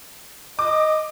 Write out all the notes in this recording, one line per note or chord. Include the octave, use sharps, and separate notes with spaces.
D#5 D6